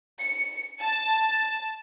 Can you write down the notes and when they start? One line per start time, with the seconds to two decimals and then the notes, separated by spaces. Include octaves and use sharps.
0.20 C#7
0.80 A5